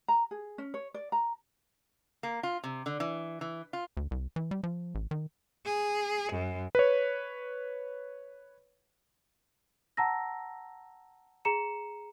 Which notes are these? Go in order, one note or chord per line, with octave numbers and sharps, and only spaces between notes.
A#5
G#4
C#4
C#5
D5
A#5
A#3
F4
C3
D3
E3
E3
F4
D2
C2
E3
G3
F3
A1
D#3
G#4
F#2
B4 C#5
F#5 A5 A#5 E6 A#6
G#4 A#5 C#7 E7